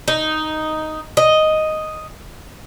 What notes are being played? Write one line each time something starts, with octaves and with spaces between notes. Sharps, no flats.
D#4
D#5